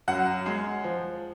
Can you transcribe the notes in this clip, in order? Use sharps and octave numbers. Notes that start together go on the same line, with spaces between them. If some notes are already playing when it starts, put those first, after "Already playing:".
F#2 F#5
G#3
F3